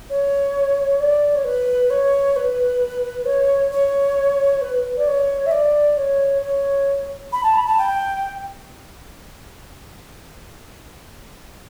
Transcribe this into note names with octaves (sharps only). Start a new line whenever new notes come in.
C#5
D5
C#5
B4
C#5
B4
C#5
C#5
B4
D5
C#5
E5
D5
C#5
C#5
B5
A5
B5
A5
G5